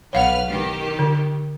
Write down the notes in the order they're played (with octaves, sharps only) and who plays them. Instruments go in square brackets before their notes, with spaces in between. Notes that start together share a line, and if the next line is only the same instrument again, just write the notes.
[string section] B1 B4 F6 [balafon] C#5 F5 F#5
[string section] D#3 G4
[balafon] D3